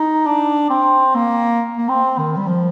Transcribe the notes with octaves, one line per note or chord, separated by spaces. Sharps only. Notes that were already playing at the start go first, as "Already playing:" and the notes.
Already playing: D#4
D4
C4
A#3
A#3
C4
D#3
G3
F3